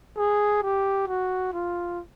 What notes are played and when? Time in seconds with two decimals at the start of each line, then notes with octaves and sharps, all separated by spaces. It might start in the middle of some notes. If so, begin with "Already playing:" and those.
0.17 G#4
0.63 G4
1.08 F#4
1.53 F4